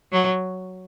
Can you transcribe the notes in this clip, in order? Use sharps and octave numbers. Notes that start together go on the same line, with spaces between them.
F#3